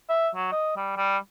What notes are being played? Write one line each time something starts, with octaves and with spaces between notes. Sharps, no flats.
E5
F#3
D#5
G3
G3